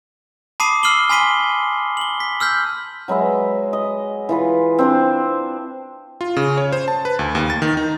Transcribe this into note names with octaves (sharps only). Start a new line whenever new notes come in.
A5 B5 D6 D#6 C7 D#7
E6 F6 C7 D#7 F#7 G7
G#5 B5 C6 B6 D#7 G7
F#7 G7
B6
E6 F6 G6 B6
F#3 G#3 B4 E5
D#5
E3 F4 B4
C4 D4 C5
F4
C#3
C#5
C5
A5
B4
D2
D#2
A6
D#3
D#4